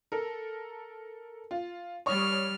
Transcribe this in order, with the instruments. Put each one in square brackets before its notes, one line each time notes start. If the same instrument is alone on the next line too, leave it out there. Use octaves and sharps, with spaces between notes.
[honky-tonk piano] A4 A#4
F4
[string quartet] G3 F6 [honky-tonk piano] C#5 C#6 D#6